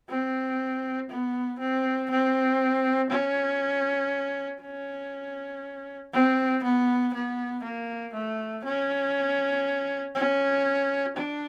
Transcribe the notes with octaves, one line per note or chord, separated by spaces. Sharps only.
C4
B3
C4
C4
C#4
C#4
C4
B3
B3
A#3
A3
C#4
C#4
D4